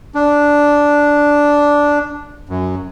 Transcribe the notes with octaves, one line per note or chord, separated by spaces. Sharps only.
D4
F#2